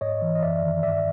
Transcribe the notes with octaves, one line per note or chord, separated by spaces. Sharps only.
G#2 C#5 D#5
E3
D#5
F#2 D5 E5
D#3
G2 D5 E5